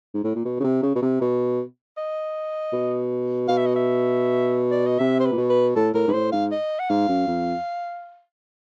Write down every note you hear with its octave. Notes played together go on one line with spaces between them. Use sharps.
G#2
A2
A#2
B2
C#3
C3
C#3
B2
C3
B2
D#5
B2
B2 F5
E5
D#5
E5
D5
D#5
C3 E5
C5
B4
A#2
B2
B4
A2 A4
A2 A#4
G#2 B4
A2 C5
G#2 F5
D#5
F#5
G#2 F5
F#2
F2